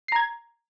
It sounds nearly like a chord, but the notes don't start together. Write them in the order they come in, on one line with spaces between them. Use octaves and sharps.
C7 A#5 G#6